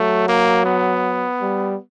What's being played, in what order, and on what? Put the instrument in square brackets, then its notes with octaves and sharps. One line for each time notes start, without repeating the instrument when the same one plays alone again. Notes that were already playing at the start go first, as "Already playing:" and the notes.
Already playing: [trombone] F#3 [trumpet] A3
[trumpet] A#3
B3
[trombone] G3